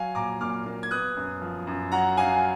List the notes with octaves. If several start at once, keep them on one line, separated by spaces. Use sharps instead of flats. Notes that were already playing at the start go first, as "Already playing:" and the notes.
Already playing: F#3 F5 G#5
A#1 A#5 D6
A#2 D6 F6
A#3
G#6
B3 D#6 F#6
F#2
F3
F#2
F#3 F#5 A#5
F#2 F5 G#5